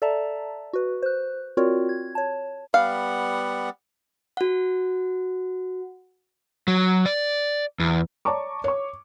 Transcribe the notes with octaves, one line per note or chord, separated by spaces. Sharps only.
A4 D5 E5 A5 A#5
F#4 B4
C5 F#6
C4 F4 F#4 A#4 C#5 D5
G#6
C#5 A5
G3 B3 F5 F#5
F#4 F#5
F#3
D5
E2
C#5 D5 A5 A#5 C#6 D6
C#5 C#6